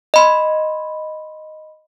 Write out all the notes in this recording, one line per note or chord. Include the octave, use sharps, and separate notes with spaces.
D#5 B5 C6